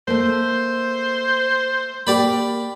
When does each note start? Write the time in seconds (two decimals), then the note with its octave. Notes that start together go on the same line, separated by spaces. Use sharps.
0.08 A3 A#3 C5
2.07 A#3 G4 D5 B5